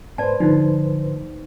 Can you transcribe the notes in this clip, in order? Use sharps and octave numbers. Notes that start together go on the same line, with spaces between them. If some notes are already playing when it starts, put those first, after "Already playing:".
G#2 B4 C5 D5 A5
D3 F3 D#4